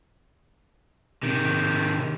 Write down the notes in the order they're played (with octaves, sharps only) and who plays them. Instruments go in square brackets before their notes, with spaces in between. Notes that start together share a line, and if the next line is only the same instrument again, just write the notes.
[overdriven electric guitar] C3 D#3